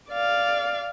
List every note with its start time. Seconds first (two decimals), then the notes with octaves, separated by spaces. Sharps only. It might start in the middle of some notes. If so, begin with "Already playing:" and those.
0.10 D5 F5